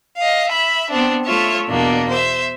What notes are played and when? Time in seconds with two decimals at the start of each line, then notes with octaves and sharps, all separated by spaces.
0.17 D#5 F5
0.50 E5 B5
0.90 B3 C4 D4
1.25 A3 F4 C#5 E5
1.68 E2 B2 A#3 D4
2.09 C5 E5